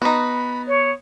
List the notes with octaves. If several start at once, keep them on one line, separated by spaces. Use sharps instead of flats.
B3 D#4 F#4 B5
C#5